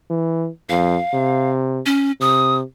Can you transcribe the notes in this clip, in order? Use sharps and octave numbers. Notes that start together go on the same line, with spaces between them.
E3
F2 F5
C3
C#4
C3 D#6